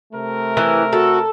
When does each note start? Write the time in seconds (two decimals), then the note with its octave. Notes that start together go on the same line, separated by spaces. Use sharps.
0.13 C3 A3 A#4
0.57 E3
0.93 F#4 A4